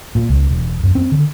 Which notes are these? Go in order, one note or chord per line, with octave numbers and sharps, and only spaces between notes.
A#2
C#2
E1
F#2
C4
D3